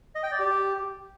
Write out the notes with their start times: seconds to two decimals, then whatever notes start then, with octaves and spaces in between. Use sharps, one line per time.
0.15 D#5
0.23 G5
0.31 D5
0.39 G4